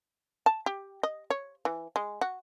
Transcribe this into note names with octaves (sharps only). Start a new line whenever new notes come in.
A5
G4
D#5
C#5
E3
G#3
F#4